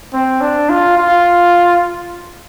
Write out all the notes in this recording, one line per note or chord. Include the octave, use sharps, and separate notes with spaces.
C4
D4
F4
F4